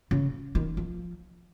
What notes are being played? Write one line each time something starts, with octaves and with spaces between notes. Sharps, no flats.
C#3
D#3
F3